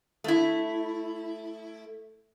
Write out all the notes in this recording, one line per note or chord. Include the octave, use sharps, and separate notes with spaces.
A3 E4